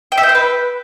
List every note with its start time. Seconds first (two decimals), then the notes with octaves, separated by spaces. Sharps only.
0.12 G5
0.18 E5
0.23 G5
0.29 C5
0.35 B4